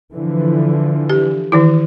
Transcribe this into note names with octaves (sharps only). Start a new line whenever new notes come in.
D3 E3 F3
G4
D#3 E3 E4